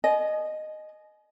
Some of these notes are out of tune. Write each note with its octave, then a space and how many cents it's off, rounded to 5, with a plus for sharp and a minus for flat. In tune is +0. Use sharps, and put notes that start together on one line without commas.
D#5 -10 G#5 +35